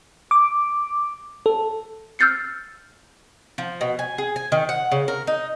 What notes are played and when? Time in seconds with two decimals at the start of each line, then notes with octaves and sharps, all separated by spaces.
0.31 D6
1.46 A4
2.19 E6 F6 G6 A6 C7 C#7
3.58 F3
3.81 B2
3.99 G#5
4.18 G#4
4.36 G#5
4.52 D#3
4.69 F#5
4.92 C#3
5.08 A#4
5.27 D#4